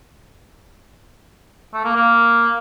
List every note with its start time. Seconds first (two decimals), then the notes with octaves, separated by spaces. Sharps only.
1.74 A3
1.85 A#3
1.96 A#3